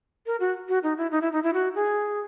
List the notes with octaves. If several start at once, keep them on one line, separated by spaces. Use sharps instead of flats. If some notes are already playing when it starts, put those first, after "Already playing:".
A#4
F#4
F#4
D#4
E4
D#4
E4
D#4
E4
F#4
G#4